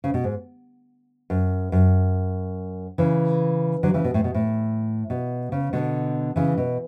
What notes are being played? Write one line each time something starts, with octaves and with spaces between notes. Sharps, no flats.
C#3
B2
G#2
F#2
F#2
C#3 E3
D3 F#3
C#3 E3
B2
A2
B2
A2
B2
C#3
B2 D3
C#3 E3
B2